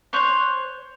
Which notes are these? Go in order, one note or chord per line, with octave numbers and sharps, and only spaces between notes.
C5 C#5 F#6